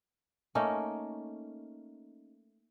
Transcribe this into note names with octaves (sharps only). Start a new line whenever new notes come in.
A3 A#3 C#4 D#4